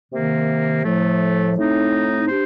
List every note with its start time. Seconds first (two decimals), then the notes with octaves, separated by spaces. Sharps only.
0.11 C3 D#3 A#3
0.83 A2 F3 A3
1.56 A2 A3 C4 D#4
2.28 D4 G4 C5